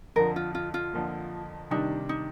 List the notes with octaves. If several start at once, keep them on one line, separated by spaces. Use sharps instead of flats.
F2 D3 F3 A#4
F4
F4
F4
F2 D3 F3 A#3
C3 D#3 G3 D4 D#4
D#4